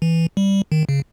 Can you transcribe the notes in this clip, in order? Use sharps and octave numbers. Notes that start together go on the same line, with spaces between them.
E3
G3
D#3
C#3